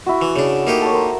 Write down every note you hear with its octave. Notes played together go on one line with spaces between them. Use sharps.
E4 F#4
E3
C#3 D4
A3 A#3 D#4 G4
A4 A#4 C#5
A#4 C5